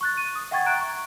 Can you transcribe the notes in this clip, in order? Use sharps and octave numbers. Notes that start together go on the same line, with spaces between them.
C#6 F#6 A6
D#7
D#6
E5 F#5 G5 C#6 G#6 A6
A#5 F#6 D7
C#6